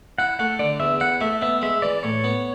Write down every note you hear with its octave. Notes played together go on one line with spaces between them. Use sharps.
E4 F#5
A3 F#5
D3 D5
E2 E5
E4 F#5
A3 E5
B3 E5
G#3 E5
E3 D5
A2 C#5
B3